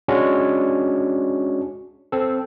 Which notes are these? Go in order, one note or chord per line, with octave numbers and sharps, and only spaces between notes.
G#3 C#4 D4 F#4
C4 A4